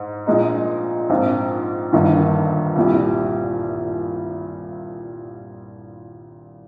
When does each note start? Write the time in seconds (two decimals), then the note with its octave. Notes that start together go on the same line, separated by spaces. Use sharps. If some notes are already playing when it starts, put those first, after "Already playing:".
Already playing: G#2
0.26 A#1 A#2 G#3 D#4
1.09 A#1 G#2 F3 C4 F4
1.92 G1 G2 D#3 A#3 F4
2.76 C2 A#2 G3